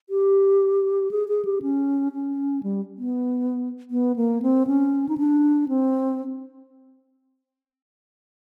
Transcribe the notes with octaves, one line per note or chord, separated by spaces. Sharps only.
G4
G#4
G#4
G4
C#4
C#4
G3
B3
B3
A#3
C4
C#4
D#4
D4
C4